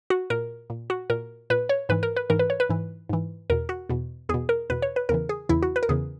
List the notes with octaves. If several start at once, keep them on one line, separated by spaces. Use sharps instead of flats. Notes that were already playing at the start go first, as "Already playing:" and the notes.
F#4
A#2 A#4
A#2
F#4
A#2 A#4
A#2 B4
C#5
G#2 E3 B4
A#4
B4
G#2 E3 A#4
B4
C#5
B4
G#2 E3
G#2 E3
E2 B2 A#4
F#4
E2 B2
E2 B2 G#4
A#4
E2 B2 B4
C#5
B4
E2 C#3 E3 A#4
G#4
E2 C#3 E3 E4
F#4
B4
A#4
E2 C#3 E3 G#4